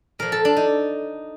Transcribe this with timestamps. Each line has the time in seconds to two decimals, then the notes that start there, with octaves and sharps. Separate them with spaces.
0.19 A#2 F3 A#4
0.32 A4
0.45 D4
0.57 D#4